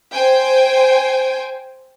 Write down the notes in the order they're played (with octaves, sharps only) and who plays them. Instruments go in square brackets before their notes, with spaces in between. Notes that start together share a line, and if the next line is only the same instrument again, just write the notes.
[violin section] C5 G5 G#5